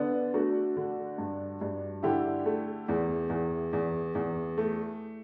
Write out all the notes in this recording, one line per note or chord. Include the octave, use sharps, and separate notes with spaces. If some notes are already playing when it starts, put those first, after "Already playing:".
Already playing: D3 B3 D4
A3 D4 F#4
D3
G2
G2
D3 E4 G4
A3
E2
E2
E2
E2
A3